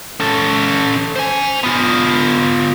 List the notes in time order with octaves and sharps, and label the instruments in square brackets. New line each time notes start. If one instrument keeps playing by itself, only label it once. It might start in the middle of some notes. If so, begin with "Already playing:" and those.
[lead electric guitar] C#4 A4
C5 G#5
B3 F4